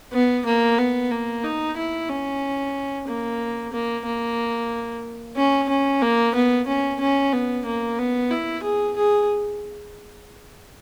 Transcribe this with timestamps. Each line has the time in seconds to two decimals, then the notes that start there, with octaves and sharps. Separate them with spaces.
0.13 B3
0.46 A#3
0.79 B3
1.11 A#3
1.44 D#4
1.77 E4
2.10 C#4
3.08 A#3
3.73 A#3
4.06 A#3
5.37 C#4
5.69 C#4
6.02 A#3
6.35 B3
6.67 C#4
7.00 C#4
7.33 B3
7.66 A#3
7.98 B3
8.31 E4
8.63 G#4
8.97 G#4